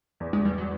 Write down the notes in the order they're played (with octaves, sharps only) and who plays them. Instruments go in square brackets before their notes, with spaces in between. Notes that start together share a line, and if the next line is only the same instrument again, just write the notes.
[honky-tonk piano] E2
[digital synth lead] G#3
[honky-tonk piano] E2 [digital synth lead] G3
[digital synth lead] F#3